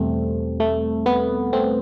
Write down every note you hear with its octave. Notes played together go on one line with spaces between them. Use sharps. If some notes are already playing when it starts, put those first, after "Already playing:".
Already playing: E2 B2 G3 A3 C4
A3
B3
A3 C4